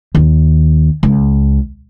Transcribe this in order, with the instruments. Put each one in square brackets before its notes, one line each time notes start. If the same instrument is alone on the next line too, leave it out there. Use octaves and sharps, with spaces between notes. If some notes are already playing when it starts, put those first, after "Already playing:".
[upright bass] D#2
C#2